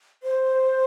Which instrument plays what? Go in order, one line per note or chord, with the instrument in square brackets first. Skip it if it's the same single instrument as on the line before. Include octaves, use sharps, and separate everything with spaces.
[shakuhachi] C5